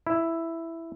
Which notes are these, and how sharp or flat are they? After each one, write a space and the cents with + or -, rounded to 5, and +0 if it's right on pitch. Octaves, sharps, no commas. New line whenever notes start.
E4 +5